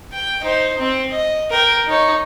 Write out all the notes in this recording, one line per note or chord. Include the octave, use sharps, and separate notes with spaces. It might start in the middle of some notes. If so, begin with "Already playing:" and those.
G5
D#4 C5
C4
D#5
A#4 G5
D#4 C#5